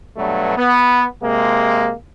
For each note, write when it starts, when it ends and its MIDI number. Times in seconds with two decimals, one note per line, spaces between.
0.17 0.55 43
0.17 0.55 47
0.17 0.55 54
0.17 0.55 57
0.57 1.06 59
1.23 1.92 48
1.23 1.92 56
1.23 1.92 58